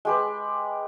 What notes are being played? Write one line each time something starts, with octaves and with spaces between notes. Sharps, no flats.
G#3 G4 B4